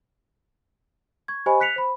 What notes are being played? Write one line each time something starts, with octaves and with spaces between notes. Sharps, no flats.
C#6 G#6
G4 C5 D#5 G#5 B5 C#6
F#6 B6 C#7 F7
C5 B5